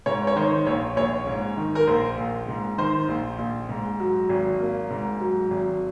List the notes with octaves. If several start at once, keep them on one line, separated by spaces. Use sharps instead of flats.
G#2 C#5
C#5
D#3 C5
A#1 C#5
A#1 C#5
G#2
D#3
A#4
A#1 C5
A#1
G#2
D#3 C5
A#1
A#1
G#2
F#3
G#1
A#3
G#2
F#3
G#1